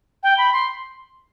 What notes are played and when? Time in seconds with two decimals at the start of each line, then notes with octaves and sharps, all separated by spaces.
0.23 G5
0.38 B5
0.53 C6